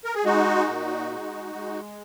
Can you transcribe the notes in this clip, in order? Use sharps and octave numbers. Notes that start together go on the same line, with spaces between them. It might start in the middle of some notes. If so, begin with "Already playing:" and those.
A#4
G#4
G#3 D#4 F#4
A#2
G#3
G#3